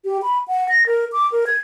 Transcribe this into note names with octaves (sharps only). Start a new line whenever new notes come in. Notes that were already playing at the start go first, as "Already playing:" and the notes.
G4
B5
F#5
A#6
A#4
D6
A#4
G#6